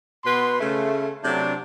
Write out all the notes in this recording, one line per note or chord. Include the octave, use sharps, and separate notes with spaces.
B2 B3 B4 C6
C#3 A3
C3 F#3 A3 D4